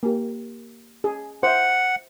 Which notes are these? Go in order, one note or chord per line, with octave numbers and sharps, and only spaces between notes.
A#3 G4
G#4
C5 E5 F#5